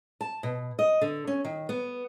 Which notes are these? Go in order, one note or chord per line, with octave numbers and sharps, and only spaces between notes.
A5
B2
D#5
D3
C#4
D#3
B3